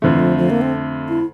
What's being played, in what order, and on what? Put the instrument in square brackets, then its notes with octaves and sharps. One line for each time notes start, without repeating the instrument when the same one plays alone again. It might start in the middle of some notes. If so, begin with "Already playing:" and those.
[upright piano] F2 D3 A3 [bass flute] E3
[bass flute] F3
F3
A#3
C4
E4